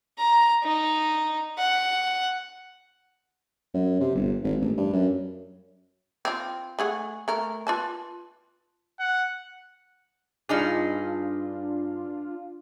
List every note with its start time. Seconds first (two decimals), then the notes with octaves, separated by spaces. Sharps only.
0.18 A#5
0.64 D#4
1.58 F#5
3.74 F#2
4.00 C3
4.15 G1
4.44 G#1
4.61 A1
4.78 G2
4.93 F#2
6.25 C4 F4
6.79 A3 G#4 F#5
7.28 A3 A#4
7.67 F4 B4 A5
9.00 F#5
10.49 G2 D4 D#4 F4 G#4